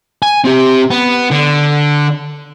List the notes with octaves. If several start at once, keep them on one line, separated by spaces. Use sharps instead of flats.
G#5
C4 G4
B3
D3